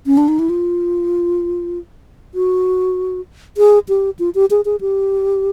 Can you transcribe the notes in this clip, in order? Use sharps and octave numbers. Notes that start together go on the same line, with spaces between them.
C#4
D4
D#4
E4
F4
F#4
G#4
G4
F4
G4
G#4
G#4
G4